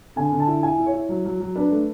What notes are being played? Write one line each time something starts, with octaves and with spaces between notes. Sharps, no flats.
D3 G#5
D3
A5
E4
E4 G#5
E4
C#5
E4
F#3
F#3
F#3
D4 B4
A3